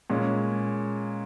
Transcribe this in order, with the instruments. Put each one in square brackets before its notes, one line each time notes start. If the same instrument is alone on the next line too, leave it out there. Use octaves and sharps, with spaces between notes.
[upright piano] A#2 G#3 C#4